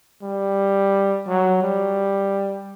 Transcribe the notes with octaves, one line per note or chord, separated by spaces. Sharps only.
G3
F#3
G3